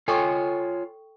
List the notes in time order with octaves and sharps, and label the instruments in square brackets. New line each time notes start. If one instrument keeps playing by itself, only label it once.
[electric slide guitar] F4 C#5 G#5 [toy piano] A4 G5 C#6